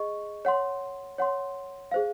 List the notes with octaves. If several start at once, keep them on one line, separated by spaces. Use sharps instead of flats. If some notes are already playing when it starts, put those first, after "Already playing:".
Already playing: G#4 D#5 C#6
C#5 F#5 C6
C#5 F#5 C6
G#4 C5 F5